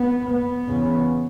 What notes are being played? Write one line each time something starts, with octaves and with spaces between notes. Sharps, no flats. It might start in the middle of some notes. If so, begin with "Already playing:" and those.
Already playing: B3
B3
E2 C#3